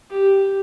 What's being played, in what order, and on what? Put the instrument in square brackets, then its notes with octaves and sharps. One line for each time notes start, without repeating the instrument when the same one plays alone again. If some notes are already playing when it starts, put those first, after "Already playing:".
[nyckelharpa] G4